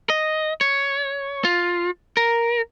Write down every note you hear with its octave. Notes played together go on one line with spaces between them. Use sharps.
D#5
C#5
F4
A#4